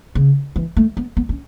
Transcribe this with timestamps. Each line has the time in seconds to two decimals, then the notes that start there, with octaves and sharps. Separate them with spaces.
0.15 C#3
0.56 E3
0.77 A3
0.97 B3
1.17 B3
1.29 C#4